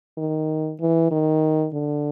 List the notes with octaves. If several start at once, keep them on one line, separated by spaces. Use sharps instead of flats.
D#3
E3
D#3
D3